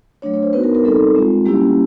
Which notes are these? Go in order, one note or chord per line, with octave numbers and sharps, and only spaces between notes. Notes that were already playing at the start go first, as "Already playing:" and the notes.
F#3 A3 D4 C#5
C#5
C5
B3 D#4 F#4 B4
A#4
A#4
G3 C4 D#4 A4
G#3 C4 F4
G3 A#3 C#4 E4 G4